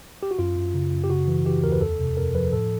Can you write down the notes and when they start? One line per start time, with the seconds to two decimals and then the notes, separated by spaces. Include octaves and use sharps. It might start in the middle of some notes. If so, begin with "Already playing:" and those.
0.23 G4
0.31 F#4
0.39 F#2 F4
0.56 F#2
0.74 C#3
0.92 F#2
1.04 G4
1.10 C#3 F#4
1.28 E3
1.46 E3 G4
1.63 D#2 A#4
1.72 B4
1.81 F2 A4
1.99 C3
2.17 F2 A#4
2.34 F3 B4
2.53 A2 A4